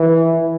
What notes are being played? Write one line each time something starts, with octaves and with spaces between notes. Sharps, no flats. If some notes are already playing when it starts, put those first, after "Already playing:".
Already playing: E3